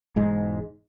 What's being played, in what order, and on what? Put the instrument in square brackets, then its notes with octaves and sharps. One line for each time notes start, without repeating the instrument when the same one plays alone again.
[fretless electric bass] E1 G#2 G#3